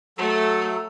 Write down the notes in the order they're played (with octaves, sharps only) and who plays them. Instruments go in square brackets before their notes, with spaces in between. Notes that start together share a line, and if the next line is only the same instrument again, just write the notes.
[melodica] F#3 A4 [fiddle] A3